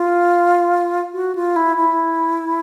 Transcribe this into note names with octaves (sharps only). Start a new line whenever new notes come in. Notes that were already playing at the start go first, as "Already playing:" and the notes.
Already playing: F4
F#4
F4
E4
E4